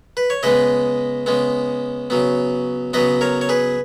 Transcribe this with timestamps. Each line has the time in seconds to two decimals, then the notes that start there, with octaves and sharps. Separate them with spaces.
0.17 B4
0.30 C#5
0.43 C#3 G#3 B3 B4 D#5
1.26 C#3 G#3 B3
2.10 C#3 F#3 B3
2.93 C#3 F#3 B3 B4 D#5
3.21 A#4 C#5
3.41 C#5
3.49 G#4 B4